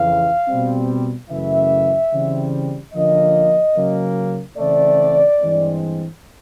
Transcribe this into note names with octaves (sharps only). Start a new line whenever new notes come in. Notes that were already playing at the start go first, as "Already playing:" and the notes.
Already playing: F2 C#3 E3 F5
B2 G3 C4
F#2 C#3 E3 A3 E5
C#3 E3 G3 C4
D3 F3 A#3 C#4 D#5
C#3 F#3 A#3 C#4
C#3 E3 A3 C4 D5
G2 E3 G#3 C4